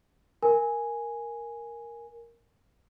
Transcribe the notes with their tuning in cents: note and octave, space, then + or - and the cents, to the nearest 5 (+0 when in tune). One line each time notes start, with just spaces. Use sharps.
A#4 +0 G#5 +0